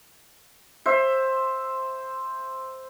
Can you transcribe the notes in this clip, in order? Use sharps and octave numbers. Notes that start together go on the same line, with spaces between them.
C5 E5